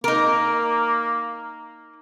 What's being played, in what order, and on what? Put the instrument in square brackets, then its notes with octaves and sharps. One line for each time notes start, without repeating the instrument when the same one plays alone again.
[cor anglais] A#3 [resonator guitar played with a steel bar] D#4 A#4